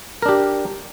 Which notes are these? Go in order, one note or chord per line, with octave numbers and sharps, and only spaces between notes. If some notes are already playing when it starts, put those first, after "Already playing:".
D4 G4 A#4